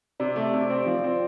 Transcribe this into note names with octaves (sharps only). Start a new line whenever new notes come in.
C3 D5
A3
C3
C4
F3
C4